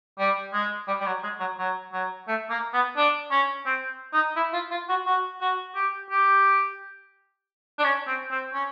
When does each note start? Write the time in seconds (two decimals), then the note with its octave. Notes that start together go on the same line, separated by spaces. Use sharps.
0.19 G3
0.53 G#3
0.88 G3
1.00 G3
1.06 F#3
1.23 G#3
1.40 F#3
1.58 F#3
1.93 F#3
2.28 A3
2.50 A#3
2.73 B3
2.97 D4
3.31 C#4
3.66 C4
4.13 D#4
4.36 E4
4.53 F4
4.71 F4
4.89 F#4
5.06 F#4
5.41 F#4
5.75 G4
6.10 G4
7.79 D4
7.84 C#4
8.07 C4
8.31 C4
8.53 C#4